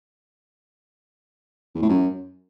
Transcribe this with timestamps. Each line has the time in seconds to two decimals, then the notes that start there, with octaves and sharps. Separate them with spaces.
1.75 E2
1.82 A2
1.89 F#2